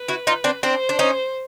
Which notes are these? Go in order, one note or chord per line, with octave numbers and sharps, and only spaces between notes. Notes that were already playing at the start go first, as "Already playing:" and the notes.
Already playing: B4
E4 F#4
D#4 F4
C4 D4
C4 D4 C5
D4
C#4 D#4